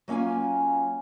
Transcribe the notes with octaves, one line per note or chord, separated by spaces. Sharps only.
F#3 A#3 C#4 F4 G#5